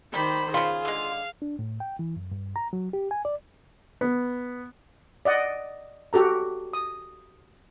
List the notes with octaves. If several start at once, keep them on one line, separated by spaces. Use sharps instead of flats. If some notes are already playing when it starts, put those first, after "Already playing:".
D#3 G3 G4 C5 B5
C#3 F4 G#4 B5
D3 G#3 F5
D4
A2
G5
E3
F#2
G2
A#5
F#3
G4
G#5
D5
B3
D5 D#5 F#5
F#4 G4 A4 A#5
D#6